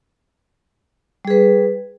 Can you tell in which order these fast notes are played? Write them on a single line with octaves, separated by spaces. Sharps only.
G3 G#4 B4